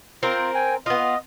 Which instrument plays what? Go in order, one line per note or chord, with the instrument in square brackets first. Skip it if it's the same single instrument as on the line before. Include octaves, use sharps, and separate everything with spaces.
[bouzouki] C4 A#4 C5 [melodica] F4
[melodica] G5 G#5
[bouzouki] B3 F4 [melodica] D#5